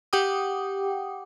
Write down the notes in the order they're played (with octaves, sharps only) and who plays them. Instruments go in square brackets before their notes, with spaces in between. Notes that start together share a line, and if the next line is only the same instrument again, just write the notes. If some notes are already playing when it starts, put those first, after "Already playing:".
[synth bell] G4 F#5 G5 D6 D#6